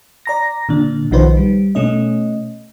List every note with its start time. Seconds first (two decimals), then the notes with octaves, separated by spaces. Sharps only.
0.26 D5 A#5 A#6
0.69 A#2 D3 D4
1.11 B1 D#3 F3 D#4 B4 C5
1.37 G3
1.75 B2 A3 C#4 D#5